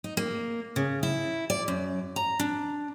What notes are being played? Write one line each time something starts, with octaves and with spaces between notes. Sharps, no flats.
D#4
A#3
C#3
E4
D5
F#2
A#5
D4